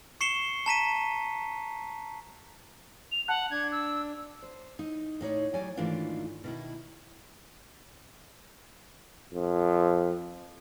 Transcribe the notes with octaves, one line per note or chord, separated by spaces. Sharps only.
C#6 C7 C#7 E7 G7
A5 A#5 B6 D#7
F7
F#5 A5 F#6
D4 G#6
E6
C5
D#4
A2 D#4 C#5 D5
F#3 G3 C#5 D5 G#5
G#2 D#3 E3 A3 D4 F4
B2 D#3 E4
F2